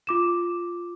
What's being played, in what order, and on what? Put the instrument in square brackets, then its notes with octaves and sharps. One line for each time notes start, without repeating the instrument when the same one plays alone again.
[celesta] F4 D6 E7